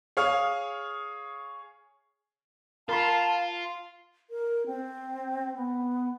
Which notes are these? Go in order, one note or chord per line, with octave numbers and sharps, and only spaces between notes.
G#4 C#5 F5 F6
F4 A#4 F5 A5 B5 C6
A#4
C4
B3